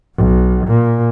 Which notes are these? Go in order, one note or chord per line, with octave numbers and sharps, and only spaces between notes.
B1
A#2